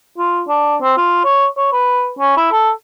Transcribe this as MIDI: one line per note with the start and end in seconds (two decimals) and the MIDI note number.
0.18 0.42 65
0.48 0.77 62
0.82 0.94 60
0.97 1.24 65
1.24 1.46 73
1.57 1.70 73
1.72 2.11 71
2.19 2.33 61
2.37 2.49 64
2.52 2.70 69